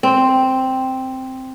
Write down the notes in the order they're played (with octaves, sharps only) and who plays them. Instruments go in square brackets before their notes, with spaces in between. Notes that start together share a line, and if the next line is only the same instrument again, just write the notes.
[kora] C4